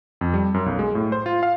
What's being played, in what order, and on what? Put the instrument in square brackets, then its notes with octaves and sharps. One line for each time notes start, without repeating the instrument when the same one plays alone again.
[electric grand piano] F2
G3
F#2
B1
G#3
A2
C5
F4
F5